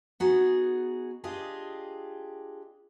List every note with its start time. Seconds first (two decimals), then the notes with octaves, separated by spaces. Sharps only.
0.20 B3 D#4 F#4 G#4
1.24 D4 F4 G4 G#4 D#5